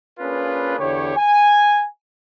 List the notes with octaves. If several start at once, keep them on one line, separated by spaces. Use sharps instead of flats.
A#3 C#4 D4 F4 G#4 B4
E2 D3 E4 G4 C#5
G#5